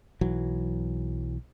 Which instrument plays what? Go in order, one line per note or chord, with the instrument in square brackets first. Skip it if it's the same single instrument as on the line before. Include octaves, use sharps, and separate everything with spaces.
[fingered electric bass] B1 E3 F#3